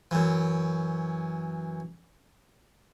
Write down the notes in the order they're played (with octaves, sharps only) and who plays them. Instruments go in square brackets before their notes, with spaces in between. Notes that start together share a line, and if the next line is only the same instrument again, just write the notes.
[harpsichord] F#2 E3